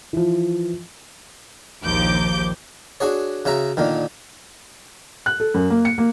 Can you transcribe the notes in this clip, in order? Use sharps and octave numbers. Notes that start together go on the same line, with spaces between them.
E3 F3
A#1 D#2 F3 D6 G6
D4 F#4 G#4 C#5
C#3 F#4 E5 A#5
A#2 D3 D#3
F#6
A4
F#2
A#3
C#7
A#3